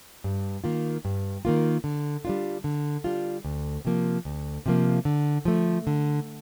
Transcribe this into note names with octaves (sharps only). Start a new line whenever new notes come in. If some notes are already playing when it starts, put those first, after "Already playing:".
G2
D#3 A#3 F4
G2
D#3 A#3 F4
D3
G3 D4 F4
D3
G3 D4 F4
D2
C3 F3 A#3
D2
C3 F3 A#3
D3
F3 A3
D3